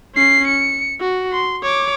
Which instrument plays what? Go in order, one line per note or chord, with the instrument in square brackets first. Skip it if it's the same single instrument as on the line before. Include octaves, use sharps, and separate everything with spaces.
[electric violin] C#4 C7
C#7
F#4
C6
C#5 D6